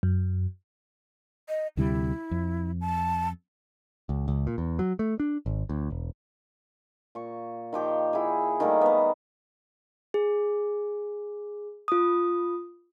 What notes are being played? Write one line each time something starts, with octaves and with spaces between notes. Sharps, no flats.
F#2
D#5
D2 C3 G3 E4
F2
A5
C#2
C#2
A#2
E2
F#3
A3
D4
G#1
D2
E1
A#2 C#6
D#3 F3 G4 G5
E4 G#4
D#3 G3 A3 A#3
B3 A#5
G#4
F4 D#6